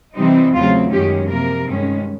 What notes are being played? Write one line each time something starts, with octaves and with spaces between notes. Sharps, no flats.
C3 E3 G3 C4 D#4
E2 C#3 F#3 A3 C4 F4
F#2 D#3 G#3 C#4 G4
C3 F3 A#3 A#4
G2 D#3 G#3 C#4